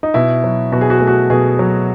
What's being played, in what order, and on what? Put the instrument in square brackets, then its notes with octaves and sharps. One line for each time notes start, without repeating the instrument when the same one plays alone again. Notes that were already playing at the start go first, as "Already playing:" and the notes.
[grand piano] D#4
B2 E4
F#3
B2 F#4
G#4
F#4
A3 G#4
F#4
B2 G#4
F#3